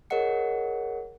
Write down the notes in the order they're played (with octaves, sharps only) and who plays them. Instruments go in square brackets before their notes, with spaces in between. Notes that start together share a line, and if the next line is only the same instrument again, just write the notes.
[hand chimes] G#4 A#4 C#5 D#5 F#5 C#7